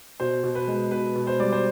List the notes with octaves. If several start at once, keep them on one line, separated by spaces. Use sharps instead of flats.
B2 C5
B2
B4
G#3
B2 B4
B2
C5
G3 D5
C5